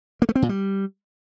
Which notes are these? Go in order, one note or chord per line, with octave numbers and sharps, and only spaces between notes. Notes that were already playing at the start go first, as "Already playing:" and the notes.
A#3
A3
C4
A#2
G3